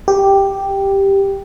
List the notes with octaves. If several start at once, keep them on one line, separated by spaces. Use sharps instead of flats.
G4